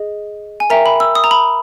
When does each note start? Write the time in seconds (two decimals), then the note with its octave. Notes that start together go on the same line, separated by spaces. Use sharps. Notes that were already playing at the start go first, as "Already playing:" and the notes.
Already playing: G#4 D#5
0.60 G#5
0.70 A#4 E5 G5 A#5
0.86 B5
1.00 E6
1.15 D#6
1.24 A#5
1.31 B5